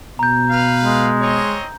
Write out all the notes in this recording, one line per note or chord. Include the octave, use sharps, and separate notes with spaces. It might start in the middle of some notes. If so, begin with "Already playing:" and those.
B2 A#5 G6
B4 F5
G#3
C4 C#5 D#5